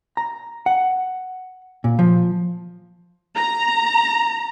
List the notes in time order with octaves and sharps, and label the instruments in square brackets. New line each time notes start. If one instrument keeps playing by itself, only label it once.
[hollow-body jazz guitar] A#5
F#5
A#2
F3
[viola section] A#5